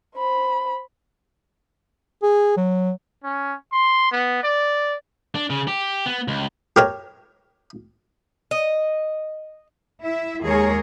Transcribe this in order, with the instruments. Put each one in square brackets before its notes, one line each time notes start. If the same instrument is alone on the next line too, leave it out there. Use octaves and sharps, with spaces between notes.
[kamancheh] C5 B5
[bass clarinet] G#4
F#3
[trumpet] C#4
C6
B3
D5
[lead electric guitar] D4
C#3
G4
B3
C#2
[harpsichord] G4 A#4 C#5
[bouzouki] D#5
[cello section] E4 E5
D#2 G#3 G#4 A#4 C#5